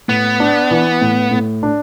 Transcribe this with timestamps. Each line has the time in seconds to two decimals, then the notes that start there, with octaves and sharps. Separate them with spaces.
0.08 A2 B3
0.40 D4
0.71 E3
1.01 A2
1.31 A2
1.63 D4